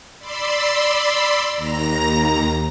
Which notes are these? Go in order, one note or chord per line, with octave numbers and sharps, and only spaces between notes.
D5 B5 C6 E6
D#2 A#5 A#6